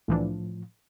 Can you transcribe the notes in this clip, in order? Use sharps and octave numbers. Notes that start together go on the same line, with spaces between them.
C2 A2 E3 F3 D4